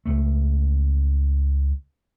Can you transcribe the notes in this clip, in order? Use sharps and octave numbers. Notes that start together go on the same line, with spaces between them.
C#2 A3